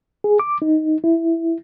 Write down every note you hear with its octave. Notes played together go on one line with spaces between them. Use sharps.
G#4
D6
D#4
E4